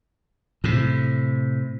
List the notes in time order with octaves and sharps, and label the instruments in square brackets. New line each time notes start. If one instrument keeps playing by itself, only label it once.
[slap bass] A2 C3